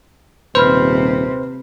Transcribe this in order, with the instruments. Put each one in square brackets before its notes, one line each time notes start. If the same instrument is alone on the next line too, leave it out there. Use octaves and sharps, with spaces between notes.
[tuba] D#1 [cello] C3 [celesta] B4 B5 F6 [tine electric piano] C5